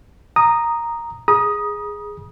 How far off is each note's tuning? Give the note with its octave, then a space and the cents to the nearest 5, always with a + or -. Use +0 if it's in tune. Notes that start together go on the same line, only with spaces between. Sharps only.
A#5 +0 D#6 -10
G#4 +0 A#5 +45 D#6 +0